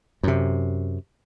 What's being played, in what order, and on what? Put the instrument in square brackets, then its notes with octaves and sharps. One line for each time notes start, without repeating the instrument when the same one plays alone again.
[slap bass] F#2 C3